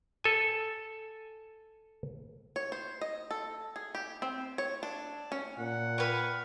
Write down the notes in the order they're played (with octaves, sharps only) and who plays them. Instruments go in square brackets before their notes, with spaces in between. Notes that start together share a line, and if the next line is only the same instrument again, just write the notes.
[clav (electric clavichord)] A4 G#5
[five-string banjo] C#5
C5
D#5
A4
G#4
G4
C4
C#5
D4
C#4
[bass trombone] A#2 [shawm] F#5
[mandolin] B4 C#5 [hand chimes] G5 F6